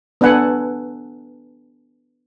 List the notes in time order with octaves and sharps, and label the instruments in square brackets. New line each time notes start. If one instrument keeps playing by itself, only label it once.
[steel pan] B3 D4 A4 B4 F#5 G#5